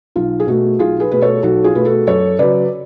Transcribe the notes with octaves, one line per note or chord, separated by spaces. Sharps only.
B1 F4
G#4
B2 A3 F#4
B1 F4 G#4
G#4 B4
B2 A3 B4
A4 C#5
B1 F#4 A4
F4 G#4
B2 A3 B4
F#4 A4
F#2 A4 C#5
C#3 F#3 B4 D5